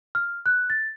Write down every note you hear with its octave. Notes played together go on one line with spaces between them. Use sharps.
F6
F#6
A6